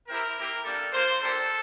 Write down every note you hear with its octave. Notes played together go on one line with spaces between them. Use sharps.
C4 E4 G4 A#4
A#3 E4 G4
G3 A#3 D4 G4 A4
A#3 F4 C5
A#3 D4 G4 A4